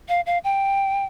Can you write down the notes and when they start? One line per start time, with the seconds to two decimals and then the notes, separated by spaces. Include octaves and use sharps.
0.09 F5
0.26 F5
0.44 G5